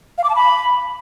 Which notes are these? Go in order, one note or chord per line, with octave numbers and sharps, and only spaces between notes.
F5
D6
A5
B5